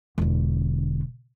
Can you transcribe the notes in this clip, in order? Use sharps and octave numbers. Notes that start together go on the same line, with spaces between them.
E1 D3